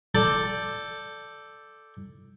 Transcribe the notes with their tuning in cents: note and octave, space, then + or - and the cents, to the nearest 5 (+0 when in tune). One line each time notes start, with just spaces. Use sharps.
A4 +0 D5 +0 G5 +0